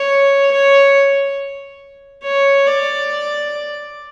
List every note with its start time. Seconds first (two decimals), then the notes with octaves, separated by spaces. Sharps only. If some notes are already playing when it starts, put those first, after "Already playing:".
Already playing: C#5
0.51 C#5
2.23 C#5
2.67 D5